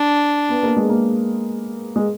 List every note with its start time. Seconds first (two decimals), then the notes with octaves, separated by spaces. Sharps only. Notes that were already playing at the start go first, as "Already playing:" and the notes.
Already playing: D4
0.49 B3
0.63 A#3
0.76 G#3
0.89 A#3
1.96 G#3